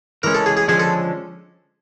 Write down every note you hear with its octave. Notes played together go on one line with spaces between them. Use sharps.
E3 G#3 C#4 A#4
A4
G#4
G#4
D3 F3 G#3 C#4 G#4
A4